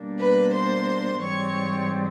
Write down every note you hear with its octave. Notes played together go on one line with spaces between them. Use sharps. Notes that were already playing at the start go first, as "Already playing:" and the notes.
Already playing: B2 G3 A#3 D4
B4 B5
C5 C6
G#2 E3 G3 C4 C#5 C#6